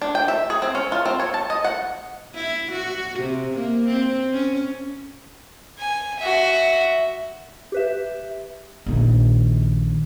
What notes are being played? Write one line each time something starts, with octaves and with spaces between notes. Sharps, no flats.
D4
G5
E5
G#4
C4
C#4
F4
C4
C#5
A5
D#5
F#5
E4
F#4
C3
A#3
C4
C#4
G#5
F#4 E5
G4 B4 E5
A#1 D#3